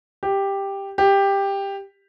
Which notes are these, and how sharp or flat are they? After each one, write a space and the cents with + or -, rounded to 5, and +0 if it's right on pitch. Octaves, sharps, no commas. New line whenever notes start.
G4 +5
G4 +10